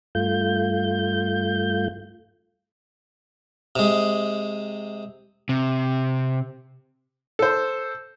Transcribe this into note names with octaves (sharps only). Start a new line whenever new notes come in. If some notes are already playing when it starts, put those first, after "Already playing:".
G2 A3 F4 G6
C3 G#3
C3
A4 C5